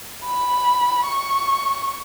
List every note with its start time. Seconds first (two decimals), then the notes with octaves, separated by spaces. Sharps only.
0.25 B5
1.06 C#6